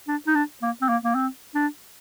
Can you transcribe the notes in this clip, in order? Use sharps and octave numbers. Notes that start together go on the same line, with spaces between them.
D4
D#4
D4
A#3
C4
A#3
A#3
C4
D4